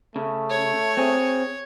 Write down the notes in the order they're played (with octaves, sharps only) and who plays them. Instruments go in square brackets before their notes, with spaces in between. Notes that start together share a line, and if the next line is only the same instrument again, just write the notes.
[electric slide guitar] C#3 [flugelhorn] A3
[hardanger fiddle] C#5
[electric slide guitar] C4 G#4